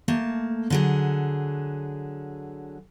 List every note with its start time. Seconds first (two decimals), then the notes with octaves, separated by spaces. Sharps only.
0.08 A3 A#3 A5
0.70 D3 F#3 G#4